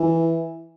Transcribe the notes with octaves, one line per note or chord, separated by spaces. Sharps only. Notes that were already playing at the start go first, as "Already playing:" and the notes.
Already playing: E3